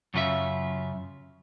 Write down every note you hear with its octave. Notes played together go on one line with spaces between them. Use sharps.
F#2 C#3 F4 A4 E5